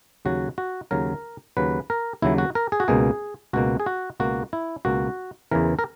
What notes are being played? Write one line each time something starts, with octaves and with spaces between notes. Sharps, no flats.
D#2 C#3 F#3 F#4
F#4
D#2 C#3 F#3 A#4
D#2 C#3 F#3 B4
A#4
D#2 C#3 F#3 E4
F#4
A#4
G#4
F#4
C#2 B2 A#3 G#4
C#2 B2 A#3 F#4
G#4
F#4
C#2 B2 A#3 F#4
E4
C#2 B2 A#3 F#4
E2 C#3 E3 A#4
A#4